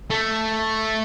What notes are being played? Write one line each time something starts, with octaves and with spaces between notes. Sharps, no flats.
A3